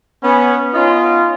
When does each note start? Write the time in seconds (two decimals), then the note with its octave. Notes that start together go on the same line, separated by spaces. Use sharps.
0.23 B3 C#4
0.74 B3 C#4 D#4 F4